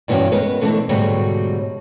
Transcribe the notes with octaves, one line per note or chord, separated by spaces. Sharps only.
G2 B2 E3 C#4 F#4 G5
G#3 B3 A#4 B4
B2 D3 E3 A3 C4 D4
G#2 B2 D3 F#3 G3 A3